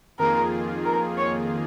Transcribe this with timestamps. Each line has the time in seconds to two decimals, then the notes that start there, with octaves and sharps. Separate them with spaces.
0.19 F2 D#3 A#3 F4 G#4 A#4
0.85 A#4
1.17 C#5